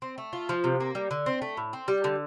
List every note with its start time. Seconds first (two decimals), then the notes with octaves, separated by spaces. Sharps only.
0.02 C4
0.18 A3
0.33 F4
0.49 F3
0.64 C3
0.80 A#3
0.95 G3
1.11 D3
1.26 C4
1.42 A3
1.57 A2
1.73 C4
1.88 G3
2.04 D3